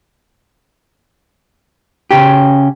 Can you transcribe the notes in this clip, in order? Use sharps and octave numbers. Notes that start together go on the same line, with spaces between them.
C#3 C#4 G4